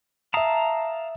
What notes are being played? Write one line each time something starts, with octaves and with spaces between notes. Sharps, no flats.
E5 F5 A5 A#5 D#6